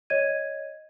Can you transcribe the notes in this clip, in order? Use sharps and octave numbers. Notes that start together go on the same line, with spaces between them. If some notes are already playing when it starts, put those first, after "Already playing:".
C#5 D#5 G#6 D#7